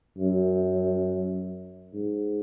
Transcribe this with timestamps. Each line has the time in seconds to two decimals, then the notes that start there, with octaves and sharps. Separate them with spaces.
0.18 F#2
1.93 G#2